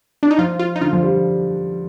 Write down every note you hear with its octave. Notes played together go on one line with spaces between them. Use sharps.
D4
D#4
F3 F4
F4
D#4
D3 F4
F3
G3